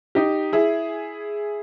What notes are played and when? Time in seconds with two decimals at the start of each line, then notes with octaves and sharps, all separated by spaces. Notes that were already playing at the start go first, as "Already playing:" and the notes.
0.15 D#4 G4
0.53 E4 G#4